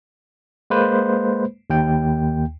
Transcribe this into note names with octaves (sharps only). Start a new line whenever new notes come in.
G#3 A#3 B4 C5
D#2 G5